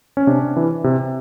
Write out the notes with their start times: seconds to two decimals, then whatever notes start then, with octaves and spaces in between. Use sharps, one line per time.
0.17 C#4
0.27 C3 D4
0.57 E3
0.84 C3